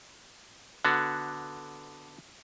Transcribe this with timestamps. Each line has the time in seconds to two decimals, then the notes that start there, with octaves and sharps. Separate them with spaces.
0.85 D3 B3 F#4